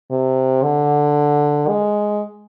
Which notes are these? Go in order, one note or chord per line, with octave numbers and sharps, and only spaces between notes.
C3
D3
G#3